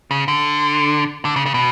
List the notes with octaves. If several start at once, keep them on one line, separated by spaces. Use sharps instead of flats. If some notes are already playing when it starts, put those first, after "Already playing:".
C#3
D3
D3
C#3
C#3
B2